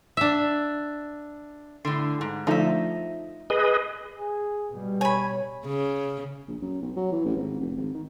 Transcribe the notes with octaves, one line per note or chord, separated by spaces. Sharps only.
D4 E5
A2 D3 C6
G#2
D3 F3 A3 D#4 E5
G#4 B4 D#5
G#4
B2 G3
C#5 G#5 B5
C#3
A#1
F#2
B1
F#3
E3
A1
G#1
F1
G#1
D#3